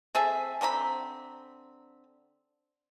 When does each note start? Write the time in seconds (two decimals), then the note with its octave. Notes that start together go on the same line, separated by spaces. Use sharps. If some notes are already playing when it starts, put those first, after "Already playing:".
0.15 C4 G#4 A4 E5
0.61 D3 C4 A#5 B5